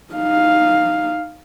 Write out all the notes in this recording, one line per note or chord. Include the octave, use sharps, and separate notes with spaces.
D#4 F5